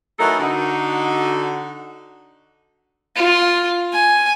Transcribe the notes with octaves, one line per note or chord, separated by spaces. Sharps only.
E3 F#3 A3 D#4 A4 A#4
D3 D#4 F#4
F4
G#5